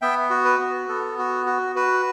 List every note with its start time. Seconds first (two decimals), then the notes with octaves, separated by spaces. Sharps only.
0.02 B3 E5 G5
0.30 F#4
0.45 B4
0.59 B3
0.89 B3 A4
1.18 F#4
1.46 F#4
1.76 F#4 B4